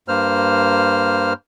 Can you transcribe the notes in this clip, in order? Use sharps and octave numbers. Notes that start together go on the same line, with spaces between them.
G2 A#3 C5 F6